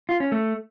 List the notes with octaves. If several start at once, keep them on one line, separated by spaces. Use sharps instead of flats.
F4
C#4
A3